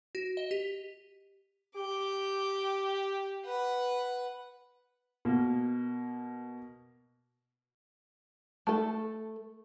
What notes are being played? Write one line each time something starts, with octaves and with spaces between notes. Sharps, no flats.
F#4
D#5
G4
G4 D6 G6
B4 F#5
B2 A#3
A3 A4